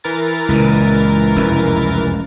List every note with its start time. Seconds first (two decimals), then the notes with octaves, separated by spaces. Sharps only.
0.04 E3 A#4 A6
0.49 C#2 A#2
1.35 F1 C#2 F#2